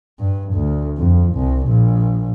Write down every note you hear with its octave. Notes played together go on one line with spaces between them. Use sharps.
G2
D2
F2
C2
A#1